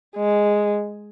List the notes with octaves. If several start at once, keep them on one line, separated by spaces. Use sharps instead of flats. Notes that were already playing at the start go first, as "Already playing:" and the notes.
G#3